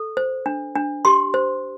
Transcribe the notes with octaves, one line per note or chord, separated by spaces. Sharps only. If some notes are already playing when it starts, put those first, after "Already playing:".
Already playing: A4
C5
D4
D4
G4 C6
C5